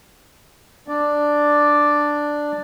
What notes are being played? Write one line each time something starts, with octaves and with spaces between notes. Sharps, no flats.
D4 D5